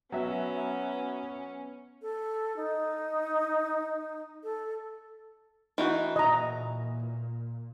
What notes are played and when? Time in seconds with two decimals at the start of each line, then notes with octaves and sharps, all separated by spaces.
0.12 F#3 B3 C#4 E5
2.02 A4
2.57 D#4
4.43 A4
5.78 E3 D#4 F#4
6.16 A#2 D#5 A#5